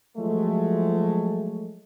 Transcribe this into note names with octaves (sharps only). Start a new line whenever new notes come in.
F3 F#3 G#3 A3